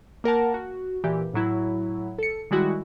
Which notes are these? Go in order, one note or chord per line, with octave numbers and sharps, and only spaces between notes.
A#3 A#4 F#5 A5
F#4
A#2 E3 G4
A2 F#3 E4
A4 C#7
D#3 G3 G#3 E4 F#4